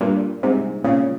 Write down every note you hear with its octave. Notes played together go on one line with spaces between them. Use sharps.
G2 A#2
G#2 C3
A#2 C#3